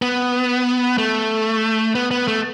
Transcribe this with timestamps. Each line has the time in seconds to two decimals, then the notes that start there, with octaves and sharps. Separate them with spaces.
0.02 B3
0.98 A3
1.95 B3
2.11 B3
2.28 A3